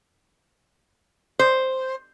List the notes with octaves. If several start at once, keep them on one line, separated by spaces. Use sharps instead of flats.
C5